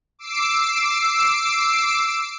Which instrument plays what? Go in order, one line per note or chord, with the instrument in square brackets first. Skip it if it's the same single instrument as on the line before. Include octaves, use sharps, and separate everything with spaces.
[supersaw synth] D6 E6 C7 D7